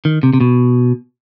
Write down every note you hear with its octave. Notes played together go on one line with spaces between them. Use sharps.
D#3
C3
C3
B2